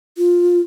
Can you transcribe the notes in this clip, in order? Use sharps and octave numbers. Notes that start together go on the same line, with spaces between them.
F4